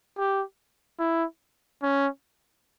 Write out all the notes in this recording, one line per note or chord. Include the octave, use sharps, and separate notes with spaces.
G4
E4
C#4